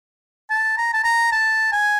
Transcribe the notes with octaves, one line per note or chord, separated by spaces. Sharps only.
A5
A#5
A5
A#5
A5
G#5